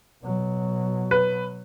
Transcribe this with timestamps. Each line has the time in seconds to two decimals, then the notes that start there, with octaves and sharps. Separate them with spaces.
0.23 B2 F#3
1.11 B4